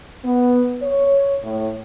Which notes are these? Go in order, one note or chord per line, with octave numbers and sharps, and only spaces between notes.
B3
C#5
A2